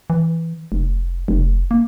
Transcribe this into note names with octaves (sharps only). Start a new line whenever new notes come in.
E3
F1
F1
A#3